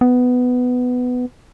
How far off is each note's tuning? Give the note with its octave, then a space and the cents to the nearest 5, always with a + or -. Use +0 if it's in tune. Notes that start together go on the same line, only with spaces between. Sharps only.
B3 +10